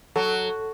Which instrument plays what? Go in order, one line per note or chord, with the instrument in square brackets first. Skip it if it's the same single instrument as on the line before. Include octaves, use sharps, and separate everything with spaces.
[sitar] F#3 [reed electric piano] A4